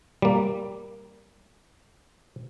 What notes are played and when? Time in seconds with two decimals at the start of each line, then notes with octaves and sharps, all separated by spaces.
0.22 G3 A#3